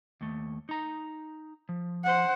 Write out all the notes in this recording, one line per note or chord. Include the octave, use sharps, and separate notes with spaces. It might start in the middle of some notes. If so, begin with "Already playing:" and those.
D#2 A3
D#4 A#5
F3
C5 F#5